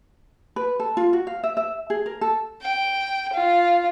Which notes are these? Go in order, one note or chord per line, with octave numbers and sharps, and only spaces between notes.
B4
A4
F4
F#4
F5
E5
E5
G#4
A#4
A4
G5
F4